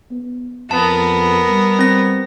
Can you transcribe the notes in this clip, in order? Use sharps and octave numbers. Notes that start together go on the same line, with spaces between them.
B3
F2 B3 A#4 A5
G3
C4 A#6